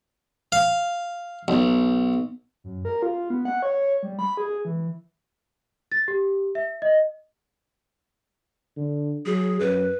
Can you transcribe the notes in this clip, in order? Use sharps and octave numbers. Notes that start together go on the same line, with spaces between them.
F5
B1
F#2
A#4
F4
B3
F#5
C#5
G3
B5
G#4
E3
A6
G4
E5
D#5
D3
F#3 G#4
F#2 B4